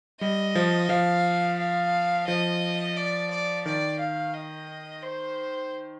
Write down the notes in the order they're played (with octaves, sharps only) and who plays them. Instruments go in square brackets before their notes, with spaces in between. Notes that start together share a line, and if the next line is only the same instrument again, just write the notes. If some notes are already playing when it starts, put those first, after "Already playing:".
[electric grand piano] G3 [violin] D#5
[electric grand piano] F3
[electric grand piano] F3 [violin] F5
[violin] F5
[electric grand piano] F3 [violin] D#5
[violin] D5
D5
[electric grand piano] D#3 [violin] D5
[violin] F5
D#5
C5